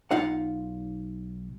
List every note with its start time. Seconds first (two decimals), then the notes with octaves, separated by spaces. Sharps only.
0.11 B1 D#4 F4 F5 F#5